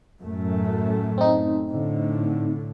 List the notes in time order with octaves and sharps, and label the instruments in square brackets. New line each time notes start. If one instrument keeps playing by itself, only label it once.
[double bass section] F#2 A2 A3
[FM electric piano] C4 D#4
[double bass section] A2 D3